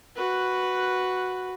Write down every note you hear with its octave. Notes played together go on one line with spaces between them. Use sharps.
F#4 B4